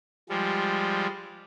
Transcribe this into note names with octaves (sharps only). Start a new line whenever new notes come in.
F3 G3 G#3